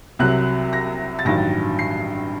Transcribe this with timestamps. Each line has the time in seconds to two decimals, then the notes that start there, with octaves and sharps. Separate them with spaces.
0.19 C2 C3 F#3 F#6
0.73 A#6
1.19 A6
1.25 A1 G2 D#3 F#3 A#6
1.79 C7